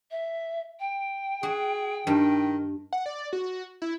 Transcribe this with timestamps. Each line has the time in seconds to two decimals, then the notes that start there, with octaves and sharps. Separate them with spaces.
0.11 E5
0.80 G5
1.43 F#4 G#4
2.07 G2 D#3
2.93 F#5
3.06 D5
3.33 F#4
3.82 E4